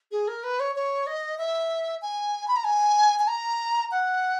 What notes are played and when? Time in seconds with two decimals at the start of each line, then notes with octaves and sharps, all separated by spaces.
0.12 G#4
0.28 A#4
0.44 B4
0.60 C#5
0.76 C#5
1.07 D#5
1.38 E5
2.02 G#5
2.48 B5
2.56 A#5
2.64 G#5
3.19 G#5
3.28 A#5
3.91 F#5